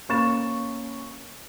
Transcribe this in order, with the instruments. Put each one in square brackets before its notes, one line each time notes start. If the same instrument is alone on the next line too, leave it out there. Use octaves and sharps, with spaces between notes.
[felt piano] A#3 C#4 B5 C#6 A6 E7